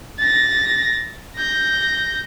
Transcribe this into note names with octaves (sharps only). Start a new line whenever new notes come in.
A6 A#6
G6 A#6